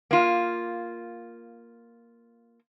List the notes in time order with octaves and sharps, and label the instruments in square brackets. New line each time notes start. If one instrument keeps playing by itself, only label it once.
[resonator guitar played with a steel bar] A#3 F4